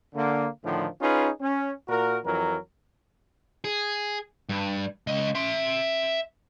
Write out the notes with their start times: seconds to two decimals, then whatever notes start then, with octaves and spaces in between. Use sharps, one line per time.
0.15 D3 A#3
0.65 A2 D3 D#3 F3
1.01 C#4 D#4 F4 G#4 B4
1.41 C#4
1.89 A#2 F#4 A#4
2.25 F2 E3 F#3 A#4
3.64 G#4
4.49 G2
5.07 C#2 D#5
5.35 E5 C6